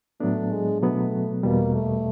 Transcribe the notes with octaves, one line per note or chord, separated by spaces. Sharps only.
A2 F#3 A3 B3 D4
G#3
B2 F#3 A3 B3
E2 B2 G3 A#3
A3